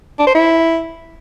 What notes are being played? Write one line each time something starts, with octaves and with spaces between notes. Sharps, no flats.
D4
C5
E4